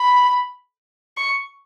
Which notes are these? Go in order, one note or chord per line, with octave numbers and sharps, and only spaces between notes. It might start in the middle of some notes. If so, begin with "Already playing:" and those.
Already playing: B5
C#6